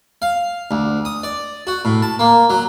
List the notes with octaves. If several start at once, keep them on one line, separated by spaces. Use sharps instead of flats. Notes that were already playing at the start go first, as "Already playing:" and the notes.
F5
D2
D#6
D5
F#4
A2
A5
A#3
F#3